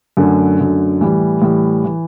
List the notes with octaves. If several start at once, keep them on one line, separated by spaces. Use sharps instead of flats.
F#2 D3 A3
F#2 D3 A3
A2 E3 G3
A2 E3 G3
E3